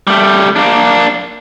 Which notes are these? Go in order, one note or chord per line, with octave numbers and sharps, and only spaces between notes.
G3 A3
A#3 D4